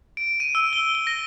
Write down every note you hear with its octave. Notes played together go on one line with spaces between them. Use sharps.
D7
D#7
E6
G7
G7
A#6